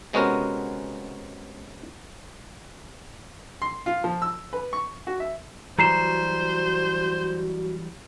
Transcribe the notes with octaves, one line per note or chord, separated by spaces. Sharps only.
C3 G#3 B3 C#4 F#4 A#4
C6
F4
F3
E6
B4
C#6
F#4
E5
E3 F#3 G3 F#4 C5 A#5 C7 E7